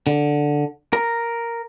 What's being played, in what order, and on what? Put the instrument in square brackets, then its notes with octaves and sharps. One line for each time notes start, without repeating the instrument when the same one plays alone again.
[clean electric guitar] D3
A#4